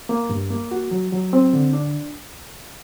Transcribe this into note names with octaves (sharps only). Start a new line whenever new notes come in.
A#3
G2
A#3
F#4
F#3
F#3
C4
D3
D4